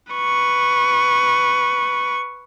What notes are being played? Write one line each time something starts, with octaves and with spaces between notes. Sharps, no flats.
B4 C#6